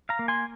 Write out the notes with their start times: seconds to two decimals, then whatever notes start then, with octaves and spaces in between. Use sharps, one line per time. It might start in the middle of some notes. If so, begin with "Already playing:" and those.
0.09 F5 A#5
0.19 A#3
0.28 G#5 C6